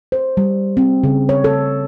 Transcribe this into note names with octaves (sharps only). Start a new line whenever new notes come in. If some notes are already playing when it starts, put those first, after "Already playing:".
C5
G3
C4
C#3
C#5
A4